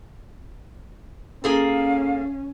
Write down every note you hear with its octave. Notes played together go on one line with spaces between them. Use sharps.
A#3 C#4 G#4 A4 F5